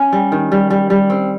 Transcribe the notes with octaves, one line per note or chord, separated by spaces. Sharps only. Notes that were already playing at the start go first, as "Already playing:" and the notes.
Already playing: C#4
G3
D#3
G3
G3
G3
C4